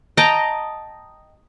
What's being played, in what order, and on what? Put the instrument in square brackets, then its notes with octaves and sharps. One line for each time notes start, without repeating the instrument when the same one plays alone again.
[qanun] D#5 G5 A5 A#5